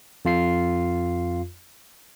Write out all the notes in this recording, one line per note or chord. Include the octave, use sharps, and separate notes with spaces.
F2 F4 C7